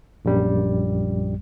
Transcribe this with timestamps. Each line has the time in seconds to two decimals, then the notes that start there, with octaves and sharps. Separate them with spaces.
0.25 A#1 F#2 G3